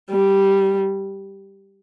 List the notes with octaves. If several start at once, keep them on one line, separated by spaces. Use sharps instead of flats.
G3